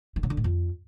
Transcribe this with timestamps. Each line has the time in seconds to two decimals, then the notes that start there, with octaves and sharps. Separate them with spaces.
0.16 D#3
0.23 C#3
0.30 D3
0.37 A2
0.44 F2